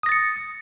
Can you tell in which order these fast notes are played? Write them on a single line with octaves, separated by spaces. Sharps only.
D#6 A#6 A6 C#7